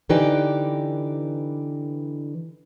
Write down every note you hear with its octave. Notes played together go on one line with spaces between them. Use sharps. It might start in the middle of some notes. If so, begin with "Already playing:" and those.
D3 E3 D#4 G4 B4 D5